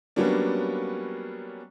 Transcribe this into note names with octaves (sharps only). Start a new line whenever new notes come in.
F#3 G3 A#3 B3 C#4 D4